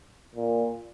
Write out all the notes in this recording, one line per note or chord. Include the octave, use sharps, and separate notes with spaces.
A#2